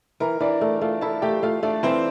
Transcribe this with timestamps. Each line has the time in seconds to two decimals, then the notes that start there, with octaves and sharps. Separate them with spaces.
0.20 E3 A#4 A#5
0.40 E3 D4 D5
0.61 A3
0.81 A3 F4 F5
1.01 E4 A4 A5
1.22 A3 G4 G5
1.43 A3 F4 F5
1.63 A3 D4 D5
1.83 E3 C4 C5